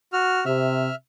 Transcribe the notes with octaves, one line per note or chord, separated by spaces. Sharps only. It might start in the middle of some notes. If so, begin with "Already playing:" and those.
F#4 F6
C3 E5 F6